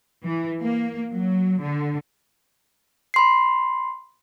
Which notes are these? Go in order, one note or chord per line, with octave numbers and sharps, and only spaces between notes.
E3
A#3
F#3
D3
B5 C6 C7